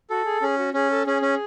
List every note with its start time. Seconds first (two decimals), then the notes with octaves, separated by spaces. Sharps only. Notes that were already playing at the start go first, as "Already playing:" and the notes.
0.10 F#4 A4
0.25 G#4
0.42 C#4 G#4
0.58 F#4
0.74 C#4 G#4
0.91 A4
1.06 C#4 G#4
1.22 C#4